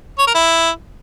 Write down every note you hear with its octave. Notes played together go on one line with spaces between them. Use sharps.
C#5
A#4
E4